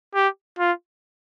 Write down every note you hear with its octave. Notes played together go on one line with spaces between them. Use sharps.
G4
F4